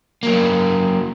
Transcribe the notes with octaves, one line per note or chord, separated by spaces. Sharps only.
F#3 A#3